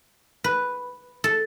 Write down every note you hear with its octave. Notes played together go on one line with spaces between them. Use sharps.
B4
A4